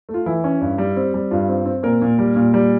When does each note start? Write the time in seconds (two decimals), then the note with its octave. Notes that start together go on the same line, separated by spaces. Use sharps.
0.09 A3
0.14 F4
0.26 E3 E4
0.44 C#4
0.61 G2
0.78 G3
0.96 C4
1.14 G3
1.31 G2 F4
1.49 C4
1.66 C4
1.83 A#2 A#4
2.02 A#2
2.19 G3
2.36 A#2
2.54 G3